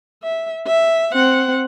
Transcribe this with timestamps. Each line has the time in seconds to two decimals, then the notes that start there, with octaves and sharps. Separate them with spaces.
0.23 E5
0.67 E5
1.13 C4 F#5